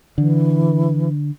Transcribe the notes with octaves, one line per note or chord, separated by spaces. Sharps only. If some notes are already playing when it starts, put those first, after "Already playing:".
D3 E3